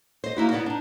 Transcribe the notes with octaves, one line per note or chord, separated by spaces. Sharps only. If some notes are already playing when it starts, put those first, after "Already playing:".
C5 D#5
A#3 D#4 E4 F#4
B3 E4 D5 D#5 F#5
D4 D#4